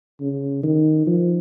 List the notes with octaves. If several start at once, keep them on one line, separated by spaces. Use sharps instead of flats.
C#3
D#3
F3